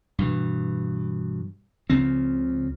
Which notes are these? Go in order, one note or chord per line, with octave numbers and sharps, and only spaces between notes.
G2 B2 E3
C#2 C#3 F3 C4